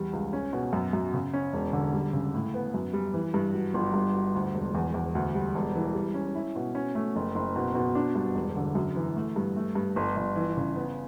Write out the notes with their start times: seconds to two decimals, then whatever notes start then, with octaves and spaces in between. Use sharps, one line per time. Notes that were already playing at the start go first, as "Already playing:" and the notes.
Already playing: E2 G3
0.13 C#2
0.33 C#4
0.53 B2
0.73 F#2
0.93 F#2
1.14 C#3
1.33 C#4
1.53 E1
1.73 D3
1.93 G3
2.13 C#3
2.34 A2
2.54 B3
2.74 F#2
2.93 G3
3.14 E3
3.34 G2
3.54 F#3
3.74 G1
3.94 G2
4.14 F#4
4.35 D2
4.55 E1
4.75 E2
4.94 E2
5.15 D2
5.35 G3
5.55 E1
5.75 E3
5.94 G3
6.14 C#4
6.35 E4
6.56 B2
6.75 C#4
6.95 A3
7.16 F#1
7.35 F#1
7.55 B2
7.75 B2
7.95 D4
8.15 G2
8.35 E1
8.56 D3
8.75 F#2
8.96 E3
9.16 A3
9.36 G2
9.56 A3
9.75 G2
9.96 G1
10.17 G1
10.36 E3
10.57 C#3
10.76 B3